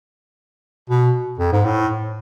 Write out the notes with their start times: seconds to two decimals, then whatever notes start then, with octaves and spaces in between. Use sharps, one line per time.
0.90 B2
1.39 F2
1.52 G#2
1.65 A2